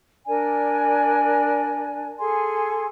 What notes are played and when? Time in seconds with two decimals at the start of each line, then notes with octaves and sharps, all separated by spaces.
0.27 D4 A#4 D5 G#5
2.18 G#4 A4 G#5 C6